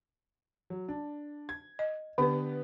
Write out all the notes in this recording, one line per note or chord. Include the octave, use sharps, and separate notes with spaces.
F#3
D4
G#6
D#5
D3 B3 D4 G4 B4